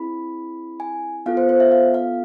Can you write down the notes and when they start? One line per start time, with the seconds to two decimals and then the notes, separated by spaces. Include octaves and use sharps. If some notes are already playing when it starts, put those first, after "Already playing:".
Already playing: C4 E4 G#4 B5
0.80 G#5
1.26 B3 F4 A4 F5
1.37 C5
1.49 C5
1.60 E5
1.72 F5
1.94 F5